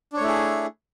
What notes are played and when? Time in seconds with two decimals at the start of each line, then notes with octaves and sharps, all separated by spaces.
0.13 D4
0.17 C#5
0.20 A3
0.24 E4
0.28 G#4